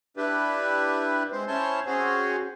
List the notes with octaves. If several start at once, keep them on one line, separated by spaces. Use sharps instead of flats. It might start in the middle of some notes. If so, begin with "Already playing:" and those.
D4 E4 G4 B4
G#3 C4 C5
C#4 E4 C5 C#5 A5 C6
C4 C#4 F#4 G#4 C5